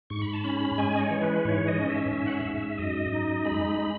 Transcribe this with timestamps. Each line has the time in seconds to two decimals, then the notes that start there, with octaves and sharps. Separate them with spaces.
0.10 G#2 C#6
0.22 B5
0.33 A5
0.44 C#4 B5
0.78 G#3 G#5
0.96 D#5
1.00 C#5
1.11 E3
1.22 B4
1.45 G#2 C#5
1.67 D#5
1.78 C#4
1.90 E5
2.12 G#2 E5
2.26 F#5
2.34 E5
2.45 G#2
2.56 E5
2.78 F#2 D#5
3.12 D#4
3.45 G#3 B5
3.78 G#3